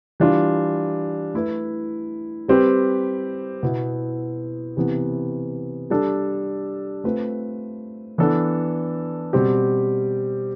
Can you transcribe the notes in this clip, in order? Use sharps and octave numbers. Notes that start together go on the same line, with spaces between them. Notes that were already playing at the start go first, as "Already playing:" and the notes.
E3 G3 D4 F4
A3 E4 B4
G3 C4 G4 B4
B2 B3 E4
C3 E3 B3
G3 D4 A4
A3 C4 F4 B4
E3 B3 D4 A4
B2 G3 C4 G4